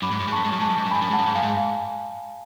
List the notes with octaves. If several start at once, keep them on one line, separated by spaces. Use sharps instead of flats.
F#2 B5 D6
G#2
F#2
G#2
F#2 A5 C#6
G#2
F#2
G#2 A5 C#6
F#2
G#2
F#2
G#5 B5
G#2
F#2
G#2
F#5 A5
F#2
G#2
F#2 F5 G#5
G#2
F5 G#5